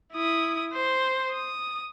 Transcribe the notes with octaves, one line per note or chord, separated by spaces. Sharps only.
E4 D#6
C5
D#6